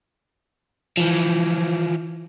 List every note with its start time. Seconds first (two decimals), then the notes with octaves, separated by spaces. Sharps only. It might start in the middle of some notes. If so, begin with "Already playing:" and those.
0.97 E3 F3